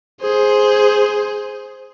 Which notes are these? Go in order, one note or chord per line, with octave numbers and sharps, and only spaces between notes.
G#4 C5